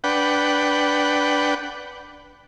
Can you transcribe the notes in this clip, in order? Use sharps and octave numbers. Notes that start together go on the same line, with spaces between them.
D4 B4 F#5 G5